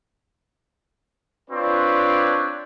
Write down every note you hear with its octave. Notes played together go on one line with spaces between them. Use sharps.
C4 D4 F4 B4 C#5 D5